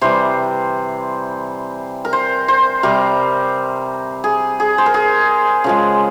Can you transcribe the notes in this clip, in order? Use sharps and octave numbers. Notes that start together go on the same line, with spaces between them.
C3 E3 G3 C5
A#4
C5
C5
C3 G3 A#4
G#4
G#4
C5
A#4
G#4
C#3 F3 G#3